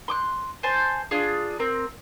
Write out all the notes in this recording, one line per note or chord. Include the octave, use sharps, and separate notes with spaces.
C6 D6 F#6
C5 G#5 A5 C6
D4 F4 G#4
C4 A#4